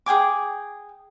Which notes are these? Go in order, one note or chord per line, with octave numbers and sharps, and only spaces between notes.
G#4 G5 G#5 D6